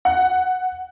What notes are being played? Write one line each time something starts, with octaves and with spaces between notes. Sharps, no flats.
F#5